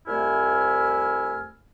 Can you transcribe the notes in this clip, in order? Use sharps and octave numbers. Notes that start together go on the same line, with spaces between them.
C2 F2 A3 E4 G#5 F6